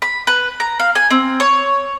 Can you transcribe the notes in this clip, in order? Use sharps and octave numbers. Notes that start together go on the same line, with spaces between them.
B5
B4
A#5
F5
G#5
C4
C#5